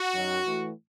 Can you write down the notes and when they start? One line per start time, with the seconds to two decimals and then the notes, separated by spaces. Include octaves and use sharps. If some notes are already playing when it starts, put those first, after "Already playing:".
Already playing: F#4
0.13 F#2 D#3 F#3
0.45 A2 E3